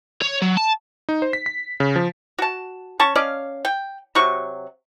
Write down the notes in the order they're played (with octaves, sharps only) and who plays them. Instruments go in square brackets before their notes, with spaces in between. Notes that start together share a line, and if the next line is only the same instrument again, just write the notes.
[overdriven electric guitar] C#5
F#3
A5
[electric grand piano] D#4
C5
B6
B6
C#3
F3
[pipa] F#4 A5
C#4 A5 C#6
C#4 D5 D#5 F5
G5
C3 F#3 F#4 C#6